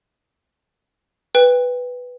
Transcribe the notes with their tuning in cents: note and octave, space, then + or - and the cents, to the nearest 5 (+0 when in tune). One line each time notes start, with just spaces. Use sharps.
B4 +0 G5 +30